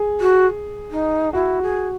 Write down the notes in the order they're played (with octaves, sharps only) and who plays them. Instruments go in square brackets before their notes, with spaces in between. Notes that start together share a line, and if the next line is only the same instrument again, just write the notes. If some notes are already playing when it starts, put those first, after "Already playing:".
Already playing: [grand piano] G#4
[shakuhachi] F#4
D#4
[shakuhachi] E4 [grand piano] F#4
[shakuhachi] G#4